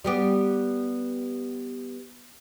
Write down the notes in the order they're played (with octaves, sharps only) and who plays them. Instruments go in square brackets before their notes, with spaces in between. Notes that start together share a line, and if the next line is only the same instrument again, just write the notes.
[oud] G3 B3 G4